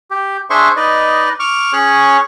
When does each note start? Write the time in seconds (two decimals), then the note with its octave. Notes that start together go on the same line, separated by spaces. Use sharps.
0.11 G4
0.50 D4 G#4 C5 E5 C6 C#6
0.76 D#4 B4 D5 D#5
1.40 C#6 D6 F6
1.73 C#4 G#4 C#5 C#6 F#6